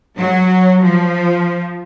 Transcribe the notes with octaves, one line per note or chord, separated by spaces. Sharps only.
F#3
F3